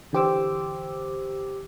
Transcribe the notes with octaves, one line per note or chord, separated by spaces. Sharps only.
D3 E3 G4 C5 D6 E6